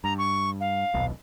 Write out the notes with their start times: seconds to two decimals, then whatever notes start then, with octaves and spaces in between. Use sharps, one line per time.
0.04 G2 A#5
0.18 C#6
0.61 F5
0.94 D#1 B1